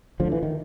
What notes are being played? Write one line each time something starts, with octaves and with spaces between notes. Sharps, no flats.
D2 D3 F3
E3
D#3